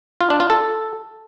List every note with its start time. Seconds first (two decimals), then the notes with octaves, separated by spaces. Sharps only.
0.21 F4
0.30 D4
0.40 F4
0.50 A4